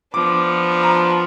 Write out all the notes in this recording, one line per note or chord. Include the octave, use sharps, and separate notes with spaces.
F3 B3 D4 D6
A#5